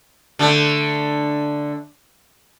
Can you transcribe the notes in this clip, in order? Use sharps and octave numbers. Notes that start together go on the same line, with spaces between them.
D3 A3